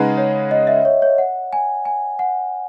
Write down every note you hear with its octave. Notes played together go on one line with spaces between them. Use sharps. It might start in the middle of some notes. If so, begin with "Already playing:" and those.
Already playing: C#3 G#3 D#4 G#4 B4 F#5
C#5
D#5
E5
C#5
C#5
F#5
G#5
G#5
F#5